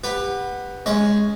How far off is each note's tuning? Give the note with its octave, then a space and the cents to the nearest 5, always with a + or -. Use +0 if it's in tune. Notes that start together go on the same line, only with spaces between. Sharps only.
G4 +25 B4 +0 F#5 +0
G#3 +0 C#4 +0 C#6 +15